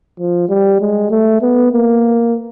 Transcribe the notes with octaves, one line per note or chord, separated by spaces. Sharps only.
F3
G3
G#3
A3
B3
A#3